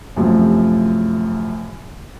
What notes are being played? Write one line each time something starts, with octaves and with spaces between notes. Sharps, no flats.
F#2 A2 C3 F3 F#3